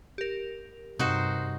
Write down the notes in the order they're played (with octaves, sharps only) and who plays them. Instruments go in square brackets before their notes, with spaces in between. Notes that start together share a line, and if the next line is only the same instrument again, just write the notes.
[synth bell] G4 A#4
[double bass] G2 [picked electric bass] C3 [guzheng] D#4 F#4 C5